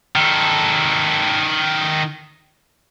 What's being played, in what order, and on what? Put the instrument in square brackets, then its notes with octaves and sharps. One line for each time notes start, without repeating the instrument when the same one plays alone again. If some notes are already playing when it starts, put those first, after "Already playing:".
[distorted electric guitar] D#3 A4